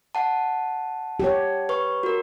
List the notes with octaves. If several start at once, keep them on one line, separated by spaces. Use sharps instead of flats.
F#5 A5
G4 C#5
B4 C#6
F#4 A#4